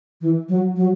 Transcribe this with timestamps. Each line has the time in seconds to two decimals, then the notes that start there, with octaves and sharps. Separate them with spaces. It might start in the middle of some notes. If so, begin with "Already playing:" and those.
0.21 E3
0.49 F#3
0.76 F#3